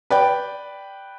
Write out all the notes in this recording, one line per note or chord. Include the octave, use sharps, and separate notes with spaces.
B4 D5 G5